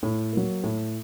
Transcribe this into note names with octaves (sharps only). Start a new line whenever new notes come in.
A2
F#3 A#3
A2